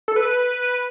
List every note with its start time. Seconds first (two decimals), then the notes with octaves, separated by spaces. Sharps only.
0.08 A4
0.16 B4